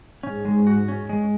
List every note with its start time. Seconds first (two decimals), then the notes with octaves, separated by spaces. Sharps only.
0.23 G#2 C#4
0.45 G#3
0.67 F#4
0.88 C#4
1.09 G#3